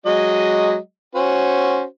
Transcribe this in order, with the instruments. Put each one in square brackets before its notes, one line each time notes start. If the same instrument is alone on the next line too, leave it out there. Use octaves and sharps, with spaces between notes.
[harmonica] F#3 G#3 D#5
C#4 F#4 C5